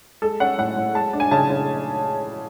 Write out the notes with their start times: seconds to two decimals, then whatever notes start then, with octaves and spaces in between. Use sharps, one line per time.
0.22 G#3 A4
0.40 C#4 F#5
0.58 A2 F#5
0.77 A2
0.95 G#3 A5
1.13 D4
1.20 G#5
1.31 C#3 A5
1.50 C#3